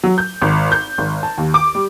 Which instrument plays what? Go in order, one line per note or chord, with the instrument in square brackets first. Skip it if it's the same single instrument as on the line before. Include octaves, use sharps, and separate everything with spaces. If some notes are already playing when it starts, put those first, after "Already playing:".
[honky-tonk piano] F#3
G6
G#1
G6
G#1
A5
D#2
D6
G3